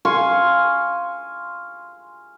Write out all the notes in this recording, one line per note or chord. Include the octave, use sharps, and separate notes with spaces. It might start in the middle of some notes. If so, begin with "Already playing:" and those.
F5 G#5 C6 C#6